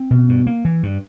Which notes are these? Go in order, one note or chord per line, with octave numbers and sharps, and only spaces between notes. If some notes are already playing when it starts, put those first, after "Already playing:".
Already playing: C4
B2
G2
A#3
E3
G2